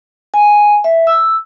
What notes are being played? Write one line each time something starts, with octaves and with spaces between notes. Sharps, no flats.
G#5
E5
E6